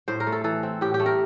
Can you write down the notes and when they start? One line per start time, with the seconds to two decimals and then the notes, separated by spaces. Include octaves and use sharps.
0.08 A2 C5
0.20 A#4
0.27 A3
0.32 A4
0.44 E3 A4
0.63 C4
0.81 A2 G4
0.94 G4
1.00 A3
1.06 A#4